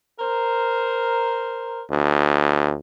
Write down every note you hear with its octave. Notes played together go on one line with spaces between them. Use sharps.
A#4 C5
D2